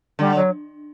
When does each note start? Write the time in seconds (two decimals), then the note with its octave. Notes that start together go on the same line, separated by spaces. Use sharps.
0.19 D3 G3
0.35 F#3